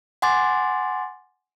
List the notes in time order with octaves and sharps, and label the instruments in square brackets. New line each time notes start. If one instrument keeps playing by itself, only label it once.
[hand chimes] F#5 G#5 C6 D6 A6